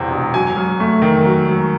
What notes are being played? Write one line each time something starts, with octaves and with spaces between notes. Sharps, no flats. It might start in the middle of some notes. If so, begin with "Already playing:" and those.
Already playing: E1 E2 C3
E1
F#3 G#5
F#2
A3
D#3
F#3
F#2